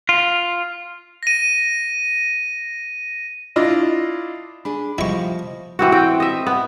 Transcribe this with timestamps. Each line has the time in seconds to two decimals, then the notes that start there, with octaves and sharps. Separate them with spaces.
0.09 F4
1.23 A#6 D#7
3.56 D4 E4 F4 D#5
4.65 D4 G#4 B5
4.98 F3 G3 A#3 E4 D#5 C#6
5.79 E3 C4 F#4
5.92 C4 G5
6.20 D#5 E5
6.47 B3